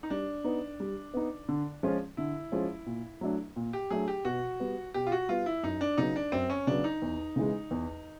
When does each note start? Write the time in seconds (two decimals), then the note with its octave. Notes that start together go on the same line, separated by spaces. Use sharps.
0.03 D#4
0.10 G3 D4
0.44 B3 D#4
0.80 G3
1.14 B3 D#4
1.49 D3
1.83 F3 G#3 C#4 F4
2.17 D3 E4
2.52 F3 G#3 C#4 F4
2.86 A#2
3.21 F#3 A3 D4
3.56 A#2
3.73 G4
3.90 F#3 A3 D4 G#4
4.08 G4
4.25 B2 F#4
4.60 G3 B3
4.94 B2 G4
5.07 F4
5.12 F#4
5.29 G3 B3 F4
5.46 E4
5.63 F#2 D#4
5.81 D4
5.97 C#3 F#3 B3 D#4
6.16 D4
6.32 F#2 C4
6.50 C#4
6.67 C#3 F#3 B3 D4
6.84 D#4
7.02 E2
7.36 C#3 E3 G#3
7.71 E2